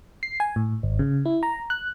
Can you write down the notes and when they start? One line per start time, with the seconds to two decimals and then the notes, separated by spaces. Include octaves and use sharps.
0.23 C7
0.40 G#5
0.56 A2
0.83 G#1
0.99 C#3
1.26 E4
1.43 A#5
1.70 F#6